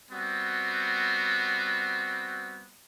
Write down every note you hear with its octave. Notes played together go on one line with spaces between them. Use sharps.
G3 B3 C4 F#4